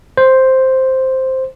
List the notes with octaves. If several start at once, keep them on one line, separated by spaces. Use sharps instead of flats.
C5